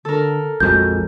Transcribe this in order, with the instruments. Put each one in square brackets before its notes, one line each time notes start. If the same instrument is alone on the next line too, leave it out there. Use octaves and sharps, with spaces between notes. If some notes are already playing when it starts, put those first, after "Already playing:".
[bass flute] D3 [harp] A4 A#4
[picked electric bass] A#1 F2 G#3 [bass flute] F#4 [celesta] G6